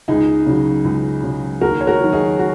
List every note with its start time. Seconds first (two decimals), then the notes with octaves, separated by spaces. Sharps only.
0.08 C#2 D#4 G#4
0.46 C#3 F#3
0.85 C#2
1.23 C#3 F#3
1.61 D#2 F#4 A#4
1.81 C#5
1.87 F#4 A#4
2.01 D#3 F#3
2.13 D#4 G#4
2.39 F#4